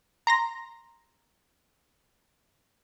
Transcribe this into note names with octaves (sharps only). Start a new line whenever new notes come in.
A#5 C6 A#6